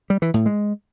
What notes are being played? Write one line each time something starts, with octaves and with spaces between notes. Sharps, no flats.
G3
E3
A2
G#3